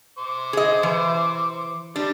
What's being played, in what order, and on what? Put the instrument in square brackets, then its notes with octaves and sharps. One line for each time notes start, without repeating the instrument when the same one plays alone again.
[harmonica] C5 D6
[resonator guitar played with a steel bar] G#4 D#5
E3
[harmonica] G3 [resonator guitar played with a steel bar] D4